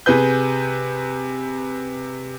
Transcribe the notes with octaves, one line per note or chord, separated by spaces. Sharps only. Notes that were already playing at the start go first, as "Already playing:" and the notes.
C3 G#4 B4 G6